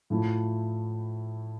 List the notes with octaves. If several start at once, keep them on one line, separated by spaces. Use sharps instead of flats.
A2 F3 A3 E4